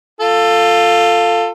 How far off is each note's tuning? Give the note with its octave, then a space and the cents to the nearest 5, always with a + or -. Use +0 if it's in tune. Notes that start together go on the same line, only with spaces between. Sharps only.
F4 +0 A4 +15